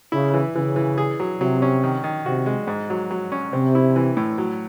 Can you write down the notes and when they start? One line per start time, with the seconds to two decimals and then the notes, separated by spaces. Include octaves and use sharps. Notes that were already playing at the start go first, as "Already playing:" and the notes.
0.12 C#3 E4
0.34 E3
0.55 C#3 E3
0.76 E3
0.98 G#4
1.20 F#3
1.40 C3 F#3
1.62 C#4
1.83 D#3
2.04 D#3
2.25 C3 F#4
2.46 G#3
2.67 G#2
2.90 F#3
3.11 F#3
3.32 C#4
3.53 C3 C4
3.75 E4
3.96 E3
4.17 A2
4.38 F#3